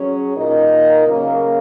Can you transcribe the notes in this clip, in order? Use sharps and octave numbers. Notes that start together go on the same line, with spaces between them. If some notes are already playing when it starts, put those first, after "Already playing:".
Already playing: F#3 C#4 G#4 C#5
A#2 A#3 D#4 A#4 D#5
C#3 F#3 A#3